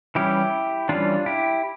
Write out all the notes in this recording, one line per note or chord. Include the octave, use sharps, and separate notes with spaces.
E3 G3 C#4 E4 G4
E3 G3 C#4 D4 F4
E4 G4